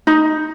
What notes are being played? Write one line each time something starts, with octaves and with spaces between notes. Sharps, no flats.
D#4